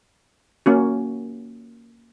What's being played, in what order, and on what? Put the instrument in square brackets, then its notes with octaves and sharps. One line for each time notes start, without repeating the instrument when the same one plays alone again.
[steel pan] A#3 C#4 F#4